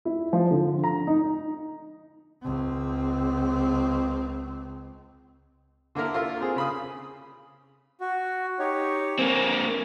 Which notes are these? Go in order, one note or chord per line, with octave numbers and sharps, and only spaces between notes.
E4
F3
D3
A#5
D#4
C#2 C4
D3 A#3 E4 A#4
F4 A4 A#4
C4 G#4
C#3 B5 D#6
F#4
D#4 G4 C#5
A#3 C4 G#5